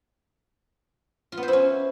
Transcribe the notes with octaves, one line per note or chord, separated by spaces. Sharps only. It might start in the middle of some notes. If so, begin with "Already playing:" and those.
F4
B3
C5
E4
C#4